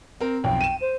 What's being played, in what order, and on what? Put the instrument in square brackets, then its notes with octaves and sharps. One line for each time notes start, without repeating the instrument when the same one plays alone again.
[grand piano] C4 A#4
[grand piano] B1 F2 [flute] G5
[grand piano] D#7 E7
[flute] C5